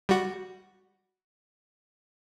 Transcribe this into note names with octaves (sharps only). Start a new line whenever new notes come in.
G3 F#4